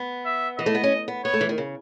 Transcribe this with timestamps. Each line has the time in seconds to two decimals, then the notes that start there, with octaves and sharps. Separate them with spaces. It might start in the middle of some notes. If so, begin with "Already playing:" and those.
Already playing: B3
0.25 E5
0.58 E3 D#5
0.66 A3
0.75 B3
0.84 C#4
1.08 B3
1.24 B3 C#5
1.34 A3
1.41 E3
1.49 D#3
1.58 C#3